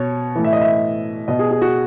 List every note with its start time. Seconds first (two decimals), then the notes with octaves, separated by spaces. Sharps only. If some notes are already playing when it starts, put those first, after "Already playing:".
Already playing: B2 C#5
0.36 A2 E3
0.44 E5
0.53 D#5
0.61 E5
1.28 B2 D#5
1.39 G#4
1.51 G#4
1.62 F#4